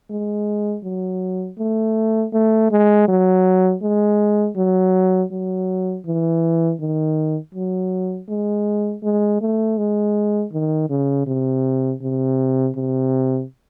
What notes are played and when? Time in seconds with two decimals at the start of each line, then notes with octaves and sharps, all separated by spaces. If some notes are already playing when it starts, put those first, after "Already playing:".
0.10 G#3
0.84 F#3
1.59 A3
2.33 A3
2.71 G#3
3.08 F#3
3.83 G#3
4.57 F#3
5.32 F#3
6.06 E3
6.80 D#3
7.55 F#3
8.29 G#3
9.04 G#3
9.41 A3
9.78 G#3
10.53 D#3
10.90 C#3
11.27 C3
12.02 C3
12.76 C3